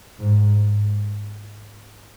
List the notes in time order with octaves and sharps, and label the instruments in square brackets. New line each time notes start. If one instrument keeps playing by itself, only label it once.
[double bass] G#2